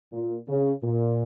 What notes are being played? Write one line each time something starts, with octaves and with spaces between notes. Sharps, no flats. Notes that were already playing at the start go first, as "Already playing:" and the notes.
A#2
C#3
A#2